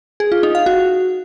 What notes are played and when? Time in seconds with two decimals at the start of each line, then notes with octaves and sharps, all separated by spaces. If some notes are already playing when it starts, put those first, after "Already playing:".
0.20 G#4
0.32 F4
0.43 D#4
0.55 F5
0.66 F#4